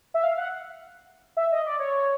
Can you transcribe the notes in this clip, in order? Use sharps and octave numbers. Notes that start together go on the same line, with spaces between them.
E5
F5
F#5
E5
D#5
D5
C#5